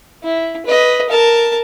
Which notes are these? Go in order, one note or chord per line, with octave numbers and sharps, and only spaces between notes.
E4
B4 D#5
A#4 A5